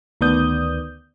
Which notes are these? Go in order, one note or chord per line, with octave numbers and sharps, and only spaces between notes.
D2 D#3 B3 D5 D#6 G6